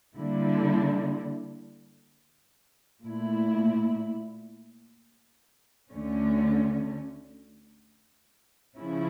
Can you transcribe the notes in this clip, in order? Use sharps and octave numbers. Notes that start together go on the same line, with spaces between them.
D3 G3 A#3 E4
A#2 A3 E4
D2 D3 A3 C#4
C#3 F3 C#4 E4